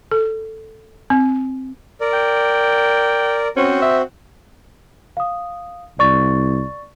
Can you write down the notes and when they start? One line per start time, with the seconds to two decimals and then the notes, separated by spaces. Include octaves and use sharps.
0.12 A4
1.10 C4
2.01 A#4 D5
2.13 G5
3.57 C4 C#4 F#4 C5
3.82 E5
5.17 F5 D#6
5.99 C2 D5 C#6 A6